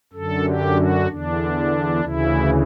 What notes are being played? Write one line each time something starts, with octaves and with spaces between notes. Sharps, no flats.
F#2 D3 A4
G4
F#4
E2 D3 D4
D2 C#3 E3 E4